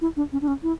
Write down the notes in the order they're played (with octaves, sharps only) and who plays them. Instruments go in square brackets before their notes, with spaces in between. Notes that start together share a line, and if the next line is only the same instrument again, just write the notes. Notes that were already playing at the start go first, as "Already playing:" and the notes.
[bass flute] E4
D4
C#4
D4
C#4
E4